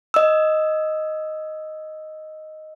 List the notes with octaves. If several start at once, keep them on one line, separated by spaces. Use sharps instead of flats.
D#5 E6